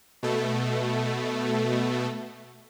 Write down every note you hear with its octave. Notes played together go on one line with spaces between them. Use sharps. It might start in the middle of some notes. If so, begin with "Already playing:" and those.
B2 A3